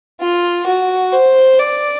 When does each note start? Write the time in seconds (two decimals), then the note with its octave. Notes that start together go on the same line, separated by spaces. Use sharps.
0.21 F4
0.66 F#4
1.13 C5
1.60 D5